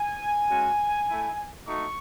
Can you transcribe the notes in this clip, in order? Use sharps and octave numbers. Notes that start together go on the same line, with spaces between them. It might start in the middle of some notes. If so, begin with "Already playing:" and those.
Already playing: G#5
G#3 C#4 F#4
A3 E4
A3 D#4 F#4 C#6